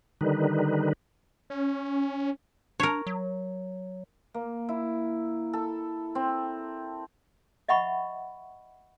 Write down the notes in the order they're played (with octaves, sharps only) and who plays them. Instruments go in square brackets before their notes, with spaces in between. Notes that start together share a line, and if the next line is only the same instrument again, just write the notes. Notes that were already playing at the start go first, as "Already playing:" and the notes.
[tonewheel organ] D3 D#3 G3 D#4 B4
[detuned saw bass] C#4
[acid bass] D4 [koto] A#4 C#5
[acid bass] F#3
[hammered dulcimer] A#3
E4
A4
C4
[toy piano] D#5 E5 F#5 B5 C#6